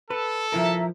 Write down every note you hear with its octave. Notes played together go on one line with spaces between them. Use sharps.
A4 B4
F3 E4 A#4 E5 A#5